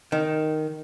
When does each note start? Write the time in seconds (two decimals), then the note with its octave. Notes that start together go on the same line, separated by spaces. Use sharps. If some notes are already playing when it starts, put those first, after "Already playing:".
0.12 D#3